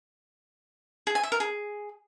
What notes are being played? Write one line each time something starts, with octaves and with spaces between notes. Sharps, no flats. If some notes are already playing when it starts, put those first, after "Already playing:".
G#4
G#5
E5
A#4
G#4